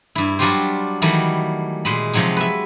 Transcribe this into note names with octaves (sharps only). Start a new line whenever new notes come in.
G2 E4
F#3 G3 D4 F4 G4 C5
D#3 E3 F#3 G3 A3
A#2 G#3 B5
C3 F3 F#3 G#3 D#4
B4 E5